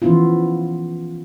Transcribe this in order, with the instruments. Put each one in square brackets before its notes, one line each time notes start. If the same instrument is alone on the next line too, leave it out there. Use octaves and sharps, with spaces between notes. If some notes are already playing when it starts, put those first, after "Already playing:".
[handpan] E3 F3 B3 C#4 E4 F4